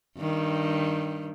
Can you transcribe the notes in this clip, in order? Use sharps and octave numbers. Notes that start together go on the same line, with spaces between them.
G2 D#3